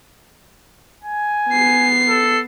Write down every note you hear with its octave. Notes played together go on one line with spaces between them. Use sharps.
G#5
B3 C7
A4